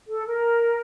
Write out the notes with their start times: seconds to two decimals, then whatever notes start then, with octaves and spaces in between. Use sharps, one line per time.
0.08 A4
0.26 A#4